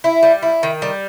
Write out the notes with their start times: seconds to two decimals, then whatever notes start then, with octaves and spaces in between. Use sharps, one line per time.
0.04 E4
0.23 G3
0.42 E4
0.63 D#3
0.82 G3